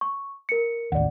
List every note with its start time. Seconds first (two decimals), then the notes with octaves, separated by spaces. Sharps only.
0.01 C#6
0.49 A#4 C#7
0.92 A1 D#2 D5 F#5